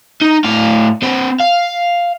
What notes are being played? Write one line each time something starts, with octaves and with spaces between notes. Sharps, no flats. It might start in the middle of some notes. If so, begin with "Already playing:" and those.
D#4
A2 F5
C4 B4
F5